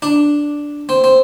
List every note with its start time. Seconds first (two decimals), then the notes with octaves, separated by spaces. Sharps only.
0.02 D4
0.89 C4
1.04 C4